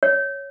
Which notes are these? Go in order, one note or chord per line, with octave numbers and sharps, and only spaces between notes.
C#5